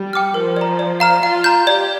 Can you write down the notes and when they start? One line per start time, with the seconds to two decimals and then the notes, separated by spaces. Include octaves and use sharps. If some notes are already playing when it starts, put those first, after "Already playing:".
Already playing: G3
0.13 G5 D6 F6
0.34 F3 A#4
0.56 D5 A#5
0.79 D5
1.00 F5 A#5 F6
1.23 F4 F5
1.44 A#5 G6
1.66 G4 D5